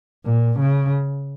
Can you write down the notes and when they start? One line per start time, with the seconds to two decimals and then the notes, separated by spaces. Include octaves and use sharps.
0.25 A#2
0.59 C#3